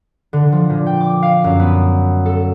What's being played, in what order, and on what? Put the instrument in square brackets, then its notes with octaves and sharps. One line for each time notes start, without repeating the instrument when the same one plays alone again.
[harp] D3
F3
A#2
G5
D6
F5
F#2
B3
A4